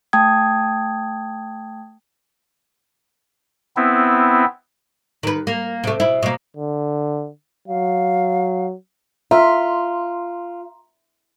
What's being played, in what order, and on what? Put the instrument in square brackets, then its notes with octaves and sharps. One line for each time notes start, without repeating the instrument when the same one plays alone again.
[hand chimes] A3 G5 A5 D#6 G#6
[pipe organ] B3 C4 E4
[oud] D#3 B4
A#3
C3 A3
B2 E4
B2 A#3
[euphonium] D3
[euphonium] F#3 [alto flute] F5
[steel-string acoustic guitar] F4 [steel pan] E5 [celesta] A#5 C6